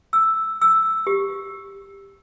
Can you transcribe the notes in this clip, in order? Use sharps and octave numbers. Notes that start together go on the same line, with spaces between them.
E6
E6
G4